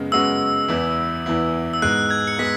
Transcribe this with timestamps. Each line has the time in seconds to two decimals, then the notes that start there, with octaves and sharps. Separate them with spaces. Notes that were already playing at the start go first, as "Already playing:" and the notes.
Already playing: F#2 C#3 G#3 B3
0.12 F#2 C#3 G#3 B3 F#4 E6
0.68 E2 E3 B3 E4
1.26 E2 E3 B3 E4
1.74 E6
1.82 G#2 G#3 B3 F#6
2.10 G#6
2.27 C#7
2.39 G#3 B3 B6